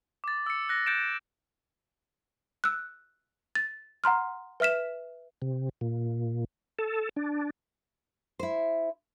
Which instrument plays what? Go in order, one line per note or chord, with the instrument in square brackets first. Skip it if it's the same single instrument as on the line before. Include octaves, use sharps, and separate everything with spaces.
[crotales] D6 A6
E6 C#7
F#6 A#6
F#6 G6 A6 C#7 D7 E7
[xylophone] E6 F#6
A6
F#5 A#5 C6 F6
B4 E5 F6 B6 E7
[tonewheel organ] C3
A#2
A4
D4
[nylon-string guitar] E4 C5